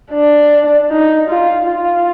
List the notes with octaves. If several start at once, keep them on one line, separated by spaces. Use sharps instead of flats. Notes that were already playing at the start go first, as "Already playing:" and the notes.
D4
D#4
F4
F4